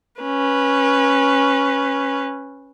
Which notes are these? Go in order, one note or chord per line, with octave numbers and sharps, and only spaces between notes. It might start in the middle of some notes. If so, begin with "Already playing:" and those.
C#4 B4